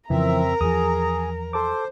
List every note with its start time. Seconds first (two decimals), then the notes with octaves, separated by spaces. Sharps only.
0.10 F2 C#3 E3 F3 C4 A#4 E5 A#5
0.61 E2 F3 G#4 D#6
1.53 A4 C5 A5 D6